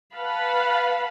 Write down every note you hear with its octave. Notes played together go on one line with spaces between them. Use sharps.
B4 F5 F#5 A5 B5